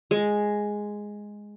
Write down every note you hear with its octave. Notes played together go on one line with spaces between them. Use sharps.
G#3